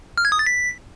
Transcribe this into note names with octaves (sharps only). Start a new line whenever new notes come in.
F6
G#6
D#6
A6
B6